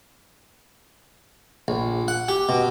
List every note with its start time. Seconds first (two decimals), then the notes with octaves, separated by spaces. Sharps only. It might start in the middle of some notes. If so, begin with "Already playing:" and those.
1.68 A#1
2.08 F#5
2.29 G4
2.49 B2